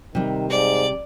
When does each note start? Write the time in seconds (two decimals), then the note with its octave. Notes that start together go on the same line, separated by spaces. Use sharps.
0.15 C3 D#3 G3
0.50 G#2 D5